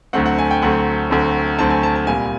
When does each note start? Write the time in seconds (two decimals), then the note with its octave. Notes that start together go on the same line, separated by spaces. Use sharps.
0.13 D2 D3 F#3 A3 C4 F#5
0.26 F#5
0.38 G#5
0.51 G5
0.62 D2 D3 F#3 A3 C4 F#5
1.10 D2 D3 F#3 A3 C4
1.59 D2 D3 F#3 A3 C4 A5
1.70 G#5
1.83 A5
1.95 A5
2.07 C2 A#2 G3 G#5